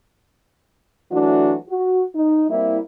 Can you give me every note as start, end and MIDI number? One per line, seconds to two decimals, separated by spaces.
1.11 1.55 52
1.11 1.55 54
1.11 1.55 57
1.11 1.55 62
1.11 1.55 66
1.69 2.03 66
2.15 2.46 63
2.50 2.79 55
2.50 2.79 58
2.50 2.79 60
2.50 2.79 64